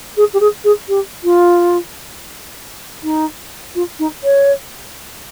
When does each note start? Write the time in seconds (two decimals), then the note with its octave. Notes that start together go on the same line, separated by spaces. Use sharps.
0.17 G#4
0.34 G4
0.40 G#4
0.64 G#4
0.88 G4
1.24 F4
3.03 D#4
3.75 F4
3.99 D#4
4.24 C#5